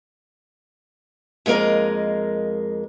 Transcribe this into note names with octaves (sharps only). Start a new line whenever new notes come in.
F2 G#3 A#3 A#4 D#5